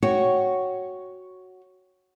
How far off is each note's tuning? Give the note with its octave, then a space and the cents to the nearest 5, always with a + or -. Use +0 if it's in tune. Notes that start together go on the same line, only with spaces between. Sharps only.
F#4 +0 C#5 +0 G5 +0